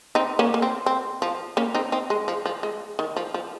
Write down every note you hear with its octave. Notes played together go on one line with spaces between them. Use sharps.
C4 D#4
A#3 C#4
A#3
C4
C4
F3
A#3 C#4
C4 D#4
C4 D#4
G#3
F3
F3
G#3
D#3
F3
F3